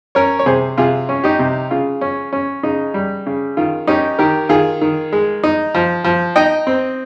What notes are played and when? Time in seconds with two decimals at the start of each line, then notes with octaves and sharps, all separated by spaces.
0.15 C#4 A#4 C#5
0.39 C#5
0.46 C3 G#4 C5
0.78 C3 F4 G#4
1.09 C#4
1.24 D#4 G4
1.39 C3
1.71 C#3 F4
2.01 C#4
2.33 C#4
2.63 C#3 D#4
2.94 G3
3.26 C#3
3.57 D#3 F4
3.87 C#4 D#4 G4
4.19 D#3 G4 A#4
4.49 D#3 F4 G#4
4.81 D#3
5.12 G#3
5.43 D#4
5.75 F3
6.04 F3
6.36 D#4 D#5 G5
6.67 C4